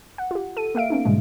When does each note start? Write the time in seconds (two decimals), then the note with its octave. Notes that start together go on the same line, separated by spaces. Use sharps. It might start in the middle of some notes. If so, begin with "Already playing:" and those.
0.18 F#5
0.31 F4 G4
0.56 A4 D#7
0.75 A#3 E5 F5 D7
0.90 B3 C#4 D#4
1.05 G#2 B2 D3 G3 G#3